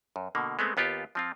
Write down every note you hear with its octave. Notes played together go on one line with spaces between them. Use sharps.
F#2
B2 D3 A#3
G#3 A3 B3 C4
D#2 B3 F4 G4
F3 C4 F4